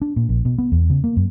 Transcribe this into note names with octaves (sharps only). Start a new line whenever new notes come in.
D4
A#2
A#1
B2
B3
E2
C#3
A#3
F#2